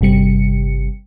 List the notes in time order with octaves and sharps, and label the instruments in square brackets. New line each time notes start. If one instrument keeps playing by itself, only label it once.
[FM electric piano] G1 C3 G3 C#7